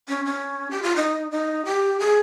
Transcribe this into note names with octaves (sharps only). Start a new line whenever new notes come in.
C#4
C#4
G4
F4
D#4
D#4
G4
G#4